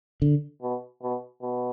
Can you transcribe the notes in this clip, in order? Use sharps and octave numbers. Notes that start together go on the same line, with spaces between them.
D3
B2
B2
B2